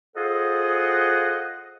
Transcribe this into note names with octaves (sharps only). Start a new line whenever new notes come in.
F4 G#4 A4 C5 D#5 F#5